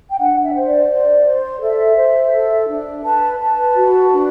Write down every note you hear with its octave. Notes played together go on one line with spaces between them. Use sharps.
G5
D4 F#5
E5
C5
D5
C5
C5
A4 E5
C5
A4
D4
B4 A5
B4 A5
F#4
D4